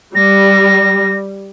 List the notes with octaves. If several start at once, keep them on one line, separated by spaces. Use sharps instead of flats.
G3 A#6